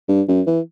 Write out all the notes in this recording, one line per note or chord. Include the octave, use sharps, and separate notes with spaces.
G2
F#2
E3